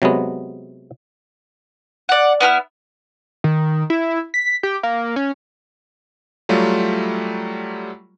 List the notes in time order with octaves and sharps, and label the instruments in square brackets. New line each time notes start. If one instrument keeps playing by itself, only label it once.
[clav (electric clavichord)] C3 F#3 G#3 B3
[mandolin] D5 F#5
B3 E4 D6 F6
[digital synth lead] D#3
E4
B6
G4
A#3
C#4
[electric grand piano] F#3 G3 A3 F4